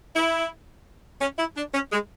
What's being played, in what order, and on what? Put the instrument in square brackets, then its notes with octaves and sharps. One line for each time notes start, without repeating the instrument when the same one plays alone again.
[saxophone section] E4
C#4
E4
D4
C#4
G#3